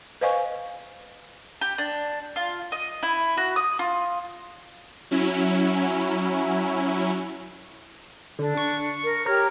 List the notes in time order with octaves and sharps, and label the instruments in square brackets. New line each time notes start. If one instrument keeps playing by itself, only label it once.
[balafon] B4 C5 D#5 F5 G#5 C#6
[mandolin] G4
D4
F4
D#5
E4
F#4
D#6
F4
[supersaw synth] F#3 C#4 E4
[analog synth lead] D3 [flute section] D4
[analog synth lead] C#6
[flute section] A#4
[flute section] G4 C#5 [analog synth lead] A#4